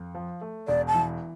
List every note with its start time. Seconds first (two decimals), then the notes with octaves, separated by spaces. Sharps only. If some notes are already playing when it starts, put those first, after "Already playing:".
Already playing: F2
0.15 F3
0.41 A3
0.68 E1 D5
0.88 A5
0.94 E3